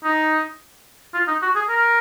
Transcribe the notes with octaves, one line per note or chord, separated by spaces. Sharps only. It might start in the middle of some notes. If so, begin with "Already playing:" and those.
D#4
F4
D#4
F#4
G#4
A#4